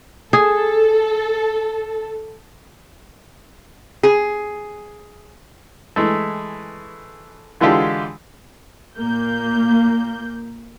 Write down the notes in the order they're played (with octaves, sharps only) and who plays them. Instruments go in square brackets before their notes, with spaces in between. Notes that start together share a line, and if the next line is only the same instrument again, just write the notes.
[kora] G#4 [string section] A4
[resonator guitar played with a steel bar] G#4
[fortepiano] E3 G#3 A3
D3 E3 G#3 F4 G4 A4
[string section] A#2 A#3 G6